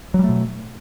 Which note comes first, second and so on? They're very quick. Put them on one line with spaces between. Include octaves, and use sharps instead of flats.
F#3 G3 A3 B2